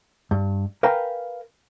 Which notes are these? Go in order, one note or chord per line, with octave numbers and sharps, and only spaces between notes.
G2
A#4 B4 F5 G5 G#5 A#5